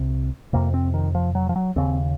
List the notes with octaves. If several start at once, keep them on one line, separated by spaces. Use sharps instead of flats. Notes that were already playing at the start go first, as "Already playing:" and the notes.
Already playing: C2 C3
F2 C3 A#3
C4
D#3
F3
F#3
F3
F#3
D#2 C#3 C4